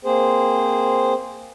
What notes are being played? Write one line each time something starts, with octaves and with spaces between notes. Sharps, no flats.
A#3 C4 G#4 C5